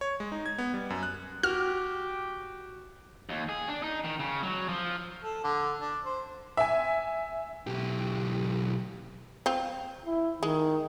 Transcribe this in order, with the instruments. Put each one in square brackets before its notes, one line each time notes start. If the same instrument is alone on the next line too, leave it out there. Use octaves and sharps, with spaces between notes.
[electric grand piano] C#5
G#3
D#4
G#6
B3
G3
F#2
F#6
[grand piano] F#4 [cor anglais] G4 [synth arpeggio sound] F6
[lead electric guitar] D#2
G#4
D4
D#4
D#3
C#3
F#3
F3
[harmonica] A4
D3
D4
C5
[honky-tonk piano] E5 G#5
[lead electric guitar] B1 G4
[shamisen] C4 F4
[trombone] E4
[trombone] D#3 [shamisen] G#3